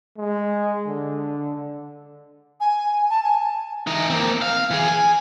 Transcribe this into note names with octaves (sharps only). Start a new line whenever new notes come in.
G#3
D3
G#5
A5
G#5
E3 D#4
A#3 C4
F5
E3 G#4
G#5